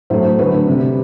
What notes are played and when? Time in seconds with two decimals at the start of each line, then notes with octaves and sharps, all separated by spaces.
0.10 A2 F#3 A3 C5
0.39 D3 F#3 A3 B4
0.67 C3 G3